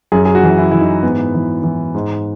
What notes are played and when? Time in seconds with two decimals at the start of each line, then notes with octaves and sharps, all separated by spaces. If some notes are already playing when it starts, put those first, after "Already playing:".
0.12 F#2 G#4
0.25 G#4
0.35 F#4
0.43 E3
0.58 E4
0.71 E3 E4
0.81 D#4
1.03 G#2 B3
1.34 E3
1.64 E3
1.95 G#2